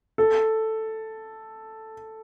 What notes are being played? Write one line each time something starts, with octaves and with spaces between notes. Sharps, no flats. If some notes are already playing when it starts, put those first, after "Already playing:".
A4